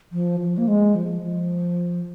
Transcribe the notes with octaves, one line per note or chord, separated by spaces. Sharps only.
F3
F3
A#3
G#3
F3
F3